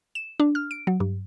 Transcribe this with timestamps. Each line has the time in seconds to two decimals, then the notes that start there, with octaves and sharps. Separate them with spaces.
0.15 E7
0.40 D4
0.55 F6
0.71 D7
0.87 F#3
1.00 G2